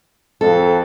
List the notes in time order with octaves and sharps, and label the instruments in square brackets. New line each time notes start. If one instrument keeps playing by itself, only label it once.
[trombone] F2 [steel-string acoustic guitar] A4